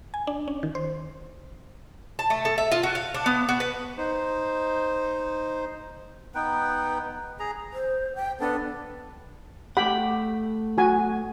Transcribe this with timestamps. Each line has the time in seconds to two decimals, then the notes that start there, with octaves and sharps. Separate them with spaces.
0.14 G#5
0.27 D4
0.48 C#4
0.63 D#3
0.75 C5
2.19 A5
2.30 A3
2.45 A4
2.58 E5
2.71 F4
2.83 F#4
2.95 F5
3.14 D4
3.26 B3
3.49 F#4
3.60 B4
3.98 D#4 C5
6.35 B3 D#4 B4 G5
7.39 G#4 A#5
7.73 C5
8.16 G5
8.40 B3 D4 A4
9.77 A3 G4 F#5 G5 B5
10.78 F#4 G#5